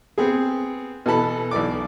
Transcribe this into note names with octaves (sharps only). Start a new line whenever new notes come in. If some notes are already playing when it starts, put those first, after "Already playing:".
B3 C4 G#4
B2 E3 A4 A5 B5
B1 E3 D5 D6